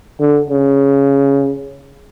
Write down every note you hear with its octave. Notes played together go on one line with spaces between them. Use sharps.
D3
C#3